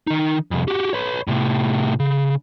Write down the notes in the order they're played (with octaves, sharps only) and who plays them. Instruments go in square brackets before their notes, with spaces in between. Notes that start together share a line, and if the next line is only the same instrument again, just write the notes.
[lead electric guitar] D#3 D#4
C2 F2
F#4 G4
B4 C#5
A2 C3
C#3